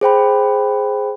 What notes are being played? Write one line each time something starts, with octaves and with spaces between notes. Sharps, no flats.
G#4 C5 G5 B5